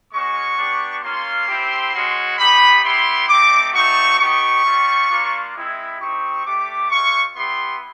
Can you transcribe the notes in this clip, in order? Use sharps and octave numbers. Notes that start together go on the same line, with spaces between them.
G#3 C#4 F#4 C#6
B3 D4 G4
A#3 C#4 F4 C6
C4 E4 G4
G#3 C#4 F#4
B3 D#4 G4 B5
B3 E4 G4 C6
A3 C4 D#4 D6
A3 C4 D#4 F#4 C#6
B3 D#4 G4 C#6
G3 C4 F4
A#3 D4 F4
G#3 C4 E4
C4 D#4 G4 C#6
A3 D4 G4 D6
G#3 C4 F4 C#6
B3 E4 G4 C6